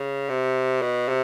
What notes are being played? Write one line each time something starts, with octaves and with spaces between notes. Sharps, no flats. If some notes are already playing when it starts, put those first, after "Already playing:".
Already playing: C#3
C3
B2
C3